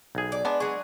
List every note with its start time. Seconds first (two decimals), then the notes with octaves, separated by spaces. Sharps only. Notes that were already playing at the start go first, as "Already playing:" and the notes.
0.15 B1 G#4
0.32 D5
0.45 G#3 B3 D4
0.60 F#3 G#4